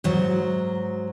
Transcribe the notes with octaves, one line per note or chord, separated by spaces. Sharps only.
G#2 F#3